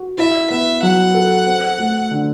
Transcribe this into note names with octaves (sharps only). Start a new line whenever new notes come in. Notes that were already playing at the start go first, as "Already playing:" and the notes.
Already playing: F#4
E4 E5
B3 E5
F#3 F#5
A4
C4
A3
D3